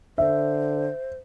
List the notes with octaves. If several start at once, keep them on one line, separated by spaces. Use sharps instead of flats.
D3 C5 E5